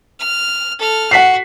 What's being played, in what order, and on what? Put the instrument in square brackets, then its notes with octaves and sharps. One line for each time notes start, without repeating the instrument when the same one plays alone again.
[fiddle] F6
A4 F6
[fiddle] F#4 [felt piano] F#5 B6 C7